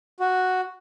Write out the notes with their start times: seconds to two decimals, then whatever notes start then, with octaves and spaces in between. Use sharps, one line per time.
0.20 F#4